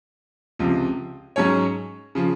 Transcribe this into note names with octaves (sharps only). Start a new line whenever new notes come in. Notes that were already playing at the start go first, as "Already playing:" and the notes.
C#2 C3 F3
G#2 F#3 C#4 G#4 C#5
C#3 F3